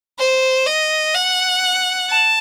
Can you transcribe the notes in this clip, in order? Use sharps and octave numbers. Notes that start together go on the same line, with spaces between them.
C5
D#5
F#5
A5